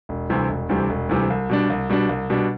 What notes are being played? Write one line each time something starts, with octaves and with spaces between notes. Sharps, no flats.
E1
D2 C3 E3 G3
E1
D2 C3 E3 G3
E1
D2 C3 E3 G3
C2
B2 G3 D4
C2
B2 G3 D4
C2
B2 G3 D4